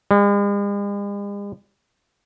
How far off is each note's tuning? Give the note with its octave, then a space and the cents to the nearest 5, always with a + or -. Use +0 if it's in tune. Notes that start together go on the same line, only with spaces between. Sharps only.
G#3 -45